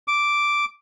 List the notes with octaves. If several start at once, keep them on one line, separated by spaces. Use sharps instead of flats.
D6